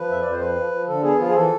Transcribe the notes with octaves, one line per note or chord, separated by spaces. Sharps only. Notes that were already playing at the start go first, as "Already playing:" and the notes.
Already playing: F3 B4
F2 E5
F2 D5
C5
F3 B4
F3
F3
D3 A4
B3 G#4
F3 F4
G#4
E3 A4